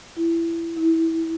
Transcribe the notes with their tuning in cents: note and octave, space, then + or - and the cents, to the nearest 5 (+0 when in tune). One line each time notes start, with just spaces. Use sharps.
E4 +20
E4 -15